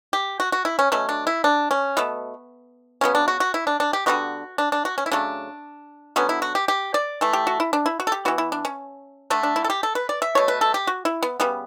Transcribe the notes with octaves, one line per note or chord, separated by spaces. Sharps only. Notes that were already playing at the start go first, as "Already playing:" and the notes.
G4
F#4
F#4
E4
C#4
B2 F#3 A3 C#4
D4
E4
D4
C#4
B2 A3 B3
C#3 F#3 B3 C#4
D4
F#4
F#4
E4
D4
D4
G4
D3 G3 B3 F#4
D4
D4
F#4
C#4
E4
C#3 F#3 A3 D4
D3 F#3 B3 C#4
E4
F#4
G4
G4
D5
E3 A3
G4
F#4
E4
D4
E4
F#4
A4
G4
E3 B3 F#4
E4
D4
C#4
D3 A3 D4
D4
E4
A4
G4
A4
B4
D5
E5
B2 A3 C#5
B4
A4
G4
F#4
E4
B3
C#3 G3 B3